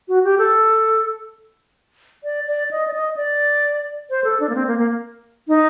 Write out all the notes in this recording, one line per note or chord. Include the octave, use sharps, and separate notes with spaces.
F#4
G4
A4
D5
D5
D#5
D5
D#5
D5
C5
A4
D4
A#3
C4
A#3
A#3
D#4